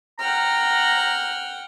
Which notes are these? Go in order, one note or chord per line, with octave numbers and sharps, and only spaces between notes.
F#5 G5 A#5 F6